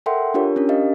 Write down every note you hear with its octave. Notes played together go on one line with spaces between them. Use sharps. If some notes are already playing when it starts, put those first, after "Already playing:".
A4 A#4 E5 F#5 G5 C6
D4 F4 G4 A#4 C#5
C#4 D4 A#4
G4 D#5 F5